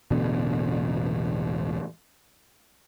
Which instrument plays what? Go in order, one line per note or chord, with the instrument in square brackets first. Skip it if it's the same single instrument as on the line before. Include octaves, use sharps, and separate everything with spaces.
[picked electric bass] E1 A1 B2 D3